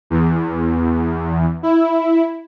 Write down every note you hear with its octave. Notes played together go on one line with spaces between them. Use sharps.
E2
E4